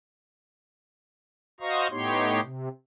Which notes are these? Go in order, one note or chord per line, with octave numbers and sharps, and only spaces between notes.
F#4 C5 D#5 F5 A#5 C#6
A2 B3 D#4 G4 C#5 C6
C3